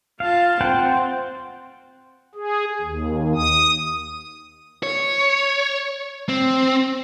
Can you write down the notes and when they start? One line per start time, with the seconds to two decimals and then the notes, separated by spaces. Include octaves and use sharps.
0.20 F4 F5 A5
0.61 C4 C5 F#5 G5
2.35 G#4
2.81 D#2
3.35 D#6
4.83 C#5
6.29 C4